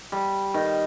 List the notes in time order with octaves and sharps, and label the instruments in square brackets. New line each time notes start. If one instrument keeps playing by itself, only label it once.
[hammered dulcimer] G3
D#3